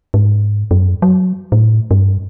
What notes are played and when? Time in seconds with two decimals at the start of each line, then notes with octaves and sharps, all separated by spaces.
0.14 G#2
0.71 F#2
1.02 F#3
1.52 A2
1.91 G2